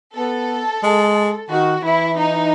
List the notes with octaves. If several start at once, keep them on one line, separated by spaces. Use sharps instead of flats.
B3 A4
G#3
D#3 F#4
E3 E4
D#4